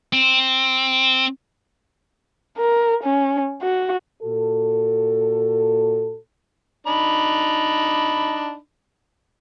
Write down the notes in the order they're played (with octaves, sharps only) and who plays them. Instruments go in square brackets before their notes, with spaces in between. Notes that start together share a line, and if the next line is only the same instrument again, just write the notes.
[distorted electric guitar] C4
[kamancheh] A#4
C#4
F#4
[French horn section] A#2 F#4 A4
[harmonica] D4 D#4 B5